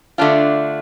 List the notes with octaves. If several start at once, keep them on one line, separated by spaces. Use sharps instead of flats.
D3 A3 D4 F4